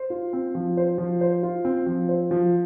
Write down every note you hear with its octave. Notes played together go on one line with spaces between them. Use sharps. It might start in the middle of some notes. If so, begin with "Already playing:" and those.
Already playing: C5
F4
C4
F3
C5
F3
C5
F4
C4
F3
C5
F3